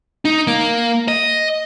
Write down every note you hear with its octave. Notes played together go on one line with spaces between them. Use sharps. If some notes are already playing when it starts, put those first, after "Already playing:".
D#4
A#3
D#5